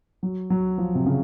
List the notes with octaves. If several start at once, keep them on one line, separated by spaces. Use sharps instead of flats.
F#3
F#3
F3
C3
C#3